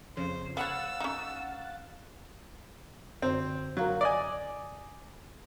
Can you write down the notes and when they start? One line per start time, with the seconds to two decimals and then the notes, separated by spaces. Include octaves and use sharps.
0.17 F2 C#3 C5
0.57 B3 C#5 F5 F#5 E6 A6
1.00 C#4 D#4
3.22 F#2 D3 C4
3.77 F#3 A#4 F5 A#5
4.01 D5 D#5 G#5